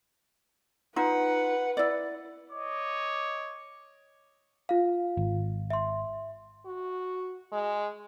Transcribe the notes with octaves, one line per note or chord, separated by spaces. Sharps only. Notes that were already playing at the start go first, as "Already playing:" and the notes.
D#4 F4 B4 F#5
E4 D5
C#5 D#5 D6
F4 F5
G#1
E5 C6
F#4
G#3